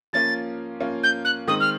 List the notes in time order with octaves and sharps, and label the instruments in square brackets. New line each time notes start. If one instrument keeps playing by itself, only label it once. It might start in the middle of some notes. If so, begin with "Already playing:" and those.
[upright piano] F3 A#3 C#4 F4 [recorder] A6
[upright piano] F3 A#3 C#4 F4
[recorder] G6
F#6
[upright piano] D#3 G#3 C4 D#4 [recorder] D#6
[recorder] F6